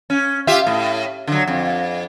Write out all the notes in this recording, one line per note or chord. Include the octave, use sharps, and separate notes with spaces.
C#4
F4 G4 E5
A2
D3 F#3
F2